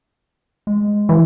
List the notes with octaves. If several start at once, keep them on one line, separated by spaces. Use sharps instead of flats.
G#3
E3